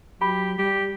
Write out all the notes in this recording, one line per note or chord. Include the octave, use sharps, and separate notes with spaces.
F#3 G4 B5
G3 G4